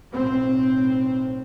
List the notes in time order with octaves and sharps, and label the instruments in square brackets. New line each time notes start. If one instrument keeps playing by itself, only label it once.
[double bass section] B1 A2 C4